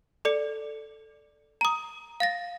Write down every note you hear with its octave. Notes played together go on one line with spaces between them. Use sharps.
A4 D5 C#7
A#5 D#6
F5 A6 A#6